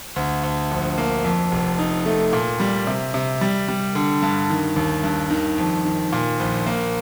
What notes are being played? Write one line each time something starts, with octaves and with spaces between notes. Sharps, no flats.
D2
D2
A#1
A#3
F2
F1
D#4
A3
A#2
G3
C3
C3
G3
G3
D3
G2
D#3
D#2
G2
D#3
F2
D#3
A#2
A#1
A#3